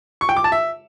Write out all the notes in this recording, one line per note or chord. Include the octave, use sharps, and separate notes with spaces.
C#6
G5
D6
A5
E5